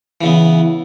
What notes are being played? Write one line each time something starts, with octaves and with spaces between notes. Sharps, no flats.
C#3 E3 B3